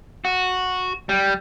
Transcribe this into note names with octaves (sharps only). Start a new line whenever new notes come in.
F#4
G3